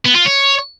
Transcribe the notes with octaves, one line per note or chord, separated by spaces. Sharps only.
B3
F4
C#5